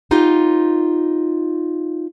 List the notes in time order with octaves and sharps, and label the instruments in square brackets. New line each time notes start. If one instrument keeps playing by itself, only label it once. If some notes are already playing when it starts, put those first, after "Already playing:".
[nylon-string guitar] B3 D#4 F4 G4